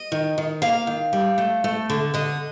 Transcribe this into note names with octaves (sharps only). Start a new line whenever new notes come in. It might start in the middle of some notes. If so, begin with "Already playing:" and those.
Already playing: D#5
D#3
D#3
A#3 F5
D#3
G3
A3
A3
D3
D3 D#5